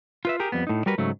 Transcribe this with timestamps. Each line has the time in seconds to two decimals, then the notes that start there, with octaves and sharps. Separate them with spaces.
0.25 F4 B4 E5
0.40 G4 G#4 A#4
0.52 F2 G3 B3
0.67 A2 D#4
0.86 G3 F#4 A#4 B4
0.98 G#2 C#3 F#3 A3